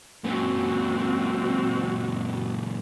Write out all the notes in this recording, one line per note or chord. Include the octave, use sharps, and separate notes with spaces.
F#2 A#2 C4 F#4